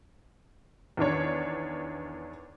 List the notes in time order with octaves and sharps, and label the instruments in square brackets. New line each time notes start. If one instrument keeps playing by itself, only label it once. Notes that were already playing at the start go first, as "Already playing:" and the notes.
[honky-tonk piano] E2 D#3 D4 C#5